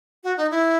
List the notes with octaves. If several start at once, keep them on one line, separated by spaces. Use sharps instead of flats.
F#4
D#4
E4